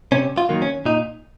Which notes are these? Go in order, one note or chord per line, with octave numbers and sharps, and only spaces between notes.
C3 C#4
F4
D#3 F#3 A#3
C#4
A#2 D#4